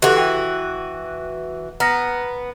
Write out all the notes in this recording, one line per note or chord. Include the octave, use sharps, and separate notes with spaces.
E3 F#4 G4 A4
G5
B3 A#5 F6 A#6